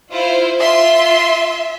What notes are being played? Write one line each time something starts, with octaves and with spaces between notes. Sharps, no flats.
E4 F4 C5
F4 E5 C6